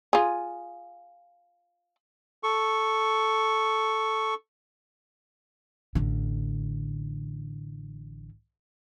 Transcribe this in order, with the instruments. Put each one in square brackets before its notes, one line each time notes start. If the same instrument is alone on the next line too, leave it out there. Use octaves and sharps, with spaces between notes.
[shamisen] F4 G#4
[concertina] A4 C#6
[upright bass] A1 D3